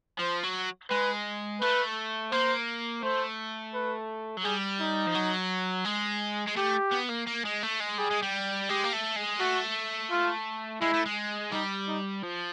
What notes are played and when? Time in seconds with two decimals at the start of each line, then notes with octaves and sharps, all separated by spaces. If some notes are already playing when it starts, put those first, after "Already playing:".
0.19 F3 C5
0.43 F#3
0.90 G#3 B4
1.61 A3 B4
2.32 A#3 C5
3.03 A3 C5
3.74 B4
4.37 F#3
4.44 G3 G#4
4.80 D#4
5.07 F3
5.15 F#3
5.85 G#3
6.48 G#3
6.57 A3 G4
6.92 B3
7.10 A#3
7.27 A#3
7.45 G#3
7.63 A3
7.80 G#3
7.98 G3 G#4
8.11 G#3
8.22 G3
8.69 G#3 G4
8.84 A#3
8.93 A3
9.16 G#3
9.40 A3 F#4
10.11 F4
10.81 G#3 E4
10.94 A3
11.06 G#3
11.52 G3 D#4
11.88 D#4
12.23 F3